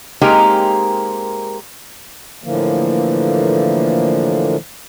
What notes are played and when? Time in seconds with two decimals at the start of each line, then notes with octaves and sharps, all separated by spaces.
0.21 G#3 A#3 C4 D#4 G4 A#4
2.44 A2 D3 E3 F3 A#3